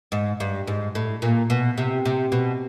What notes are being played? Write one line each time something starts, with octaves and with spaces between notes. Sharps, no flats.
G#2
G2
G#2
A2
A#2
B2
C3
C3
B2